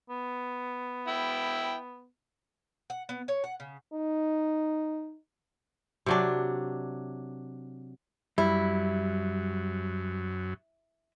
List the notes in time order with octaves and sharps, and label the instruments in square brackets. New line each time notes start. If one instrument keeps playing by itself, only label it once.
[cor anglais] B3
[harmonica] E4 G5
[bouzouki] F#5
B3
C#5
F#5
C#3
[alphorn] D#4
[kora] C3 F#3 D4
[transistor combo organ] F#2 [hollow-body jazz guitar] G3 [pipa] E4